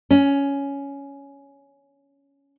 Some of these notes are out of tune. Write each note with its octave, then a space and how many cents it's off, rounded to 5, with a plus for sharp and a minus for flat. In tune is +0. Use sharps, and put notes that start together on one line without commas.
C#4 +10